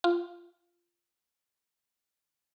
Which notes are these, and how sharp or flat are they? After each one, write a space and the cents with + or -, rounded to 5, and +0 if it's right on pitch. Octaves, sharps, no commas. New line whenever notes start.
F4 -10